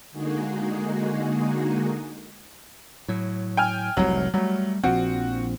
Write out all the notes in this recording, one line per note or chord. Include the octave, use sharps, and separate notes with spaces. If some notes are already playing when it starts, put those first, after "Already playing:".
D3 G#3 A#3 D#4 F#4 G#4
A2 F#3
G5 G#5 F6
F1 C2 A2 F#3
F#3 G3 A3
A#1 F3 C4 F#4